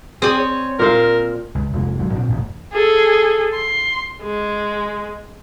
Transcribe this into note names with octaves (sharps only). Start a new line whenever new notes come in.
C4 G#4 D5 G#5
C#5
A#2 A#4 C5 F5
C#2
F1 F2 G#3 A#3
F#1 F#3 G#3
A#2 C4 D4
E1 A1 A#2
G#4 A4
C6
G#3